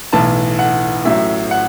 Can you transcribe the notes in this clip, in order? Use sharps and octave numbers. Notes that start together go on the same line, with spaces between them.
B1 A2 E3 A5
F#5
A1 A2 F#3 E5
F#5